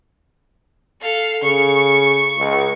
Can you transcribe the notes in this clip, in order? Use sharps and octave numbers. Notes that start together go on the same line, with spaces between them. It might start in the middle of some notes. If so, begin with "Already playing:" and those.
A4 F5
C#3 C#6
C#2